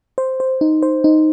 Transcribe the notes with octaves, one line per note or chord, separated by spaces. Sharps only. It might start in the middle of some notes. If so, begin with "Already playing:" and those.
C5
C5
D#4
C5
D#4